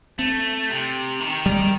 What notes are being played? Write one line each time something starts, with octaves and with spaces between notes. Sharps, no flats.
A3 C4
C3
D#3
G3